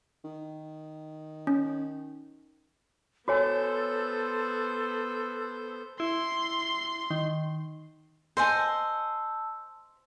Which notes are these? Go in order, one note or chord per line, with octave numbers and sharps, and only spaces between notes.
D#3
C#4
B3 F#4 A4 C5 C#5 G#5
E4 C6
D#3
C5 D#5 F#5 G#5 A5 E6